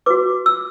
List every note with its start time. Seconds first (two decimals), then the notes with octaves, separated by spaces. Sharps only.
0.06 F#4 B4 D6
0.46 E6